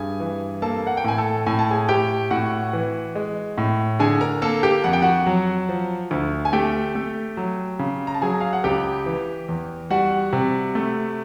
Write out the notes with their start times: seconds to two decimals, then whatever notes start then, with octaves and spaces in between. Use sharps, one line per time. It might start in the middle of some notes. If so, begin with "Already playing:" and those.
Already playing: G2 G#4 G#5
0.20 E3
0.62 A#3 A4 A5
0.87 F#5
0.97 G5
1.04 A2 G#5
1.18 A4 A5
1.46 A2 G#5
1.59 A5
1.71 G#4 G#5
1.89 A2 G4 G5
2.31 A2 F#4 F#5
2.73 E3
3.15 G#3
3.58 A2
3.99 D3 G#4 G#5
4.21 A#4 A#5
4.42 A#3 A4 A5
4.63 G4 G5
4.84 F2 F#5
4.93 G5
5.02 F#4 F#5
5.26 F#3
5.69 F3
6.11 D2
6.45 G#5
6.53 A3 G4 G5
6.95 A3
7.37 F#3
7.79 C#3
8.07 A#5
8.14 A5
8.22 F#3 G#4 G#5
8.40 F5
8.53 F#5
8.64 C#2 G4 G5
9.06 E3
9.49 E2
9.90 G3 F#4 F#5
10.33 C3
10.75 A3